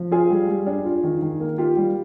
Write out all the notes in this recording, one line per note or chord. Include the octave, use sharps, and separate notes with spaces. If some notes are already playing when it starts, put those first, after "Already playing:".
Already playing: F3
F4 G#4
G3
G3
D4
F4
D#3
D#3
A#3
F4 G4
G3